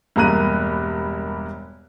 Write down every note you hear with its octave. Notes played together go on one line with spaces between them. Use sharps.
E1 G2 A#3 A#5 F#6 D#7